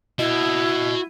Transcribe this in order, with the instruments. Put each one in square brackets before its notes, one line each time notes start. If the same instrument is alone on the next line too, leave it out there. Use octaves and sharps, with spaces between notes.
[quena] E4 [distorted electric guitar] F#4 D#5